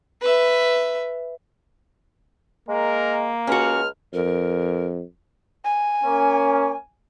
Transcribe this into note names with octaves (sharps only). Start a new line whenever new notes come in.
B4 E5
G#3 A#3 A#4
C#2 C#4 F#4 F6
F2 A#4
G#5
A#3 C#4